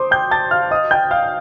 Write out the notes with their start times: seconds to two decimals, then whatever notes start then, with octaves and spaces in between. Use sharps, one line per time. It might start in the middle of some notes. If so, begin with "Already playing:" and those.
Already playing: C5 C6 D6 D#6
0.11 G5 G6
0.31 A5 A6
0.51 F5 F6
0.71 D#5 D#6
0.91 G5 G6
1.11 F5 F6